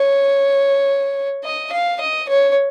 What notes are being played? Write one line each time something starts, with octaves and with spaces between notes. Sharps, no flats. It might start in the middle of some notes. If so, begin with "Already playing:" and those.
Already playing: C#5
D#5
F5
D#5
C#5